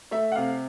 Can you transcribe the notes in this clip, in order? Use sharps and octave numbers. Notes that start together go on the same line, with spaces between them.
A3 E5
F#5
C3 F5